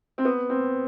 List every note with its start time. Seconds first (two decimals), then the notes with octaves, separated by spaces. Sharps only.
0.18 C4
0.25 B3
0.49 C4